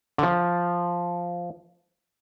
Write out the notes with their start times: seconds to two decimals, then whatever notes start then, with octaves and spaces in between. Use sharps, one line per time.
0.18 D3
0.23 F3